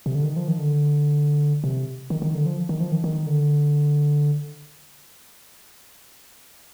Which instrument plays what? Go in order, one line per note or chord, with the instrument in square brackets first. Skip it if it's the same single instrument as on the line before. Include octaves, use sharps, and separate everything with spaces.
[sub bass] C3
D3
D#3
F3
D#3
D3
C3
D#3
D#3
D3
F3
D#3
F3
D#3
D#3
D3